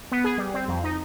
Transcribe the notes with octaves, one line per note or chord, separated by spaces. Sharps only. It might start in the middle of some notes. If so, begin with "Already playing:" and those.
B3
G#4
G3
C4
F2
D#4